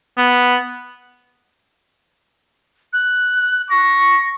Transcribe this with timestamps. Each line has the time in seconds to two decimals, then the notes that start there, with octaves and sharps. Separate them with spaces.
0.18 B3
2.93 F#6
3.70 C#6 A#6